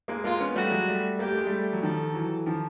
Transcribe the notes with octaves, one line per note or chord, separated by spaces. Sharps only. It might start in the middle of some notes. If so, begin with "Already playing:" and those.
G#3 A#3
G#3 A#3 F4
B3 C#4
G3 A3 F#4
F#3 G#3
G3 A3
A#3 G4
A3
G#3
G3 A3
F#3
D#3 F3 A4
E3 F#3
D#3 F3